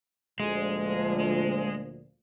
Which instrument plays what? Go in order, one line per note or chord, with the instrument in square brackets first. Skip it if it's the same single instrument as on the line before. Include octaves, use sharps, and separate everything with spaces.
[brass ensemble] D2 A#2 F3 [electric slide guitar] G#3